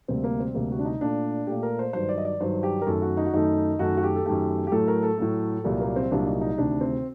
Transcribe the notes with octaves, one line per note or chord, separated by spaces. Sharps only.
D2 C3 G3 A#3 C4
A#3
C4
D2 C3 G3 A#3
F#4
D4
D#4
A#2 A3 D4
A#2 A3 G4
A#4
C5
G2 D#3 F#3 C5
D5
D#5
D5
G2 D#3 F#3 C5
G4
A#4
F#2 D#3 A3 A4
F#4
D#4
F#4
F#2 D#3 A3 D#4
F#2 D#3 A3 F#4
F#4
G4
A4
F#2 D#3 A3 G4
G4
A2 F#3 A3 A4
A#4
A4
A2 F#3 A3
C2 A#2 F#3 A#3
A#3
C4
C2 A#2 F#3 A#3 D4
D#4
D#4
D2 C3 D#3 D4
C4